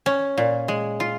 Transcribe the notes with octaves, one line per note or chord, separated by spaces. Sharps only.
C#4
A#2
G#3
F4